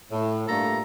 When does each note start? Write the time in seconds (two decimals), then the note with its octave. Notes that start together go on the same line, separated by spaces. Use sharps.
0.12 A2
0.48 G2 A#2 A3 A#3 A4 A#5